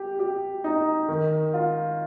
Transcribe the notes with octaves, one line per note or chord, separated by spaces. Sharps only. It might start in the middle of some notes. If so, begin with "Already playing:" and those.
Already playing: G4
G4
D#4
D#3
F4